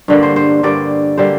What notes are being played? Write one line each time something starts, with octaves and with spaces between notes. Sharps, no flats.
G2 D3 G3 A#3
C5
C5
G2 D3 G3 A#3 D5
D3 G3 A#3 C5